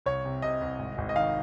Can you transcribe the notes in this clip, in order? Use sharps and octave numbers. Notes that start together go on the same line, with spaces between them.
C2 C#5
C3
C3 D#5
C2
G#1
G#1
D#5
D#3 F5